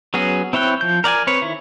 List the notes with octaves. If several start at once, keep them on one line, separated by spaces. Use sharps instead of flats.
F#3 B3 C#4 F#4 G#4
C4 E4 C#5 G5 F#6
F3 G6
A#4 D5 F#5 G#5
C4 B4 C#5
D#3 E4